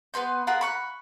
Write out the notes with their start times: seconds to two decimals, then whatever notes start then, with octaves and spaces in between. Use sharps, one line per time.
0.14 B3 B4 C6 G6
0.47 F4 G#4 A#4 F#5
0.61 B5 C#6 F#6